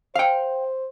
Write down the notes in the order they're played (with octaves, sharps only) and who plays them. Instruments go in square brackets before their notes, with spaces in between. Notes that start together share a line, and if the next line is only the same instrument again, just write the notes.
[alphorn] C5 [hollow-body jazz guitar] F5 G5